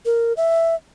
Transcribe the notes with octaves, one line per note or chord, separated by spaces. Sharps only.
A#4
E5